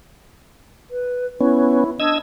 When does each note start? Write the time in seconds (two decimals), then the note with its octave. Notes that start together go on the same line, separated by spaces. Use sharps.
0.91 B4
1.41 B3 C#4 E4
2.00 D4 D#5 E6 G#6